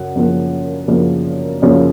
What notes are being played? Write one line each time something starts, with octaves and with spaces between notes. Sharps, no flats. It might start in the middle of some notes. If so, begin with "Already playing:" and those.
Already playing: F#2 C#3 F#5
F#2 C#3 F3 A#3
F#2 C#3 F3 A#3
F#2 C#3 F3 A#3